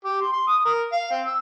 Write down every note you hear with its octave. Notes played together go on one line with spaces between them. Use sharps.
G4
C6
C6
D#6
A#4
F5
C4
E6